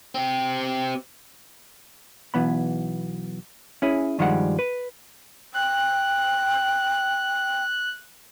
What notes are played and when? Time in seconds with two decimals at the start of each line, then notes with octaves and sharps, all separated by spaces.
0.15 C4 G4
2.34 B1 E3 B3 B5
3.82 C#4 E4 G#4
4.18 G2 D#3 F3 G3 G#3 F#5
4.59 B4
5.54 G5 F#6